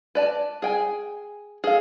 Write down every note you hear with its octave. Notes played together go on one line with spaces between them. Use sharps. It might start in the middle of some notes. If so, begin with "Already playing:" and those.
B4 D5 A5
G#4 G5 G#5
G#4 A4 F5